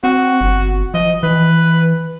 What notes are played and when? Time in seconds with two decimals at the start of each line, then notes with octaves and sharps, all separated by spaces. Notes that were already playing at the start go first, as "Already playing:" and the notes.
0.04 C4 F#4
0.41 G1
0.94 F3 D#5
1.23 E3 B4